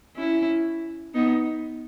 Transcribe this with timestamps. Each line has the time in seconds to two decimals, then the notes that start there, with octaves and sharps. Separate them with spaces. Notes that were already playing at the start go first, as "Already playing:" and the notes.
0.16 C#4 E4
1.14 B3 D#4